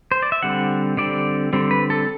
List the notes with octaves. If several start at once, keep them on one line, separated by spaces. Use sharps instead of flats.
C5
D5
E5
D3 G3 C4 F#5
D3 G3 C4 D5
D3 G3 C4
B4
A4